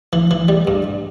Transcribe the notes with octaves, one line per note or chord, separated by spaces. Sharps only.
E3
E3
G3
G2